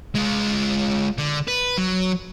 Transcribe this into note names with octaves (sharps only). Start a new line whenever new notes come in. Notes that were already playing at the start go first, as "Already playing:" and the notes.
G#3 F4
D3
B4
F#3